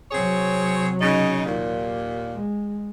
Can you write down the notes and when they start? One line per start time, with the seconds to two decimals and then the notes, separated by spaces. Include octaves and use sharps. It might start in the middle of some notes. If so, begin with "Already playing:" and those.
0.12 C3 F#3 C4 G#4 C#5
1.01 C#3 D#4
1.46 D#2 A#2
2.35 G#3